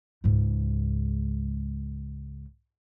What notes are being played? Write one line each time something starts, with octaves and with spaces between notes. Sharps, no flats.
C#2 G#2